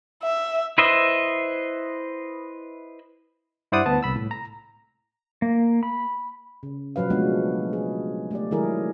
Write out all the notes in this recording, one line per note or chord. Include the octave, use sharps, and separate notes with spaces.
E5
E4 B4 C5 D#5 E5
G2 E4 C5 D5 F#5 D#6
D2 B3 A5
C2 B5 E6
A2
A#5
A#3
B5
C#3
B2 F3 F#3 B4 F5
F3 G#3 A3 B3 D4 F#4
G#4
A3 G4 D5
D#3 F#3 G#3 E4 G#4 A#4